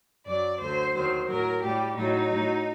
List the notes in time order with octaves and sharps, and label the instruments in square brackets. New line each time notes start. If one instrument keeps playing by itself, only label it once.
[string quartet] F#2 F#3 D5
D2 D3 F#3 C5
D#2 D#3 F#3 C5
A2 F#3 A#4
A2 G3 G4
A2 F#3 D#4
A2 F#3